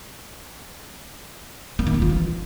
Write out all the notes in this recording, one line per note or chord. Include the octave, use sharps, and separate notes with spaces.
A#3
D#3
D4
F4
E3